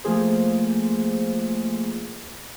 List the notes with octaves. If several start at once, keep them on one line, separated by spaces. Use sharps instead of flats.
F3 A3 A#3 F4 G#4 C5